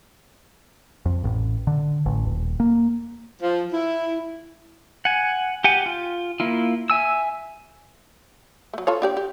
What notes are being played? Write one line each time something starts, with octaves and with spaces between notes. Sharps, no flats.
F2
A1
D3
A1
D#1
A#3
F3
E4
F#5 G#5
G4 F#5 G#5
F4
A#3 E4 F4
E5 G#5 E6
F#3 A3
F4 A4 C#5
D4 G4 D5
G4